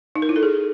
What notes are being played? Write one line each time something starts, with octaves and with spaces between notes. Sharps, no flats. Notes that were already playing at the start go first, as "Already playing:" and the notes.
D#4
A#4
E4
A4
G#4